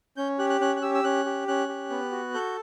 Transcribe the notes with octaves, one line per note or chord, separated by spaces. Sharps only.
C#4 G6
G4 F#6
F#6
C#4 F#6
F#6
G4 E6
E6
C#4 F#6
G4
C#4 F#6
G4
B3
F#4
A4 G6